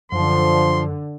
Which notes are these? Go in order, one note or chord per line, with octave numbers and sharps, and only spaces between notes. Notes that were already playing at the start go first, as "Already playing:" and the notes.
F#2 D3 F3 C6